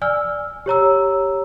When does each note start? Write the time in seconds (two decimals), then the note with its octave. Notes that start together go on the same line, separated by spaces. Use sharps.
0.02 D5 G#5 E6 F6
0.66 G4 C#5 A#5 E6